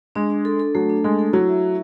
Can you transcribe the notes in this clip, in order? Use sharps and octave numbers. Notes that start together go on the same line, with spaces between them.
G#3 D4
D4
A4
A4
F#3 A3
D4
G#3 A4
A4
F#3 E4
E5
E4